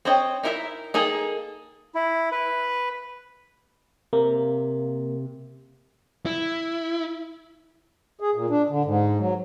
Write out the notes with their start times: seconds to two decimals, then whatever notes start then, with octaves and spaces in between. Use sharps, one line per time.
0.05 C4 C5 C#5 D#5
0.43 D#4 E4 A#4 C5 E5
0.94 A#3 D#4 G#4 A4
1.95 E4
2.32 B4
4.13 C3 A#3
6.26 E4
8.20 G#4
8.35 A#2
8.50 D4
8.69 D3
8.85 G#2
9.19 F#3